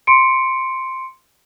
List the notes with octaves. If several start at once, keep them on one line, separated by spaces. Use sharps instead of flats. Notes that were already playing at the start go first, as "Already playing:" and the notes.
C6 C#7 D7